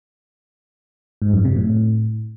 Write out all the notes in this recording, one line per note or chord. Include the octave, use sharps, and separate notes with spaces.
G#2
F#2
C3
A2